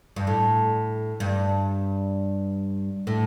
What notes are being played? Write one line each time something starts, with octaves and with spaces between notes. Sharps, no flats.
G2
A2
G2
A2